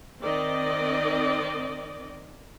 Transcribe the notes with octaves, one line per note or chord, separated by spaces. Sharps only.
D#3 C4 D5 D#5